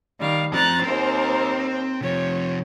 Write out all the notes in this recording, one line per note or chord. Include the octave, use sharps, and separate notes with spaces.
D#3 G3 F5
F3 C4 A#5 F#6 A6
D#2 C4 A#4 C5
C3 F3 C#5